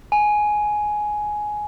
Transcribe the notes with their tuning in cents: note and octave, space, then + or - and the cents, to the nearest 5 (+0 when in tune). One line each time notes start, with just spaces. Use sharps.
G#5 +10